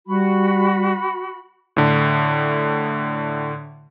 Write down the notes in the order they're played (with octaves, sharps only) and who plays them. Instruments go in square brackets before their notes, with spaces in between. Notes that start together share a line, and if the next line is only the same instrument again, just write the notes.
[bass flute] G3 [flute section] F#4 B5
[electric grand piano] A2 D3